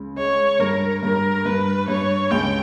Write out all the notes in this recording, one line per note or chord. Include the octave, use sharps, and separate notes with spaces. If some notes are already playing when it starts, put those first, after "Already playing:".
Already playing: C#2 C#3
G#3 C#5
G2 A#4
G2 A#4
G2 B4
G2 C#5
C#2 G5